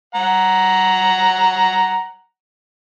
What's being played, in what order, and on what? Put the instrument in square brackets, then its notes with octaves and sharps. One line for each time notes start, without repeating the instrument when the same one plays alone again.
[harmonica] F#5 A#5